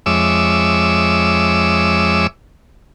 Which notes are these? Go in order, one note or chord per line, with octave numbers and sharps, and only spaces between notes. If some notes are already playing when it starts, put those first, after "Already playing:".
F2 G#3 C#5 E5 D6 E6